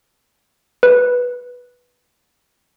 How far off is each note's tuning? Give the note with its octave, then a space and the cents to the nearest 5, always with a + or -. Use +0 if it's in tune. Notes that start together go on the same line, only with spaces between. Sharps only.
B4 -5